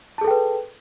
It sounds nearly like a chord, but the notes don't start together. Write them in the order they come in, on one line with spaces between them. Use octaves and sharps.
A5 G#4 A4 G5 B4